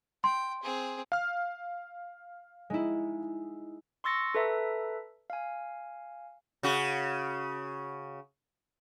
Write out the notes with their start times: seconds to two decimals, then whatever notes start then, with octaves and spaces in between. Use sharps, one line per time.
0.24 G5 C6
0.63 C4 G#4
1.12 F5 F6
2.70 G#3 D#4 E4
4.04 C6 C#6 E6 A6 A#6 C#7
4.35 A4 B4 E5 A#5
5.30 F5 G#5
6.63 C#3 F#4